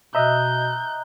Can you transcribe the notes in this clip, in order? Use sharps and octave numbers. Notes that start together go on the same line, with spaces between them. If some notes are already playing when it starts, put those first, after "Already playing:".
B2 D#5 E5 A#5 F#6 G6